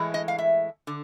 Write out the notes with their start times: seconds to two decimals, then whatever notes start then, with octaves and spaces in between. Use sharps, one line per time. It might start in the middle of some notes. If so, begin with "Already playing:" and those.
Already playing: A2 E3 G#3
0.14 D#5
0.28 F5
0.39 E5
0.87 D3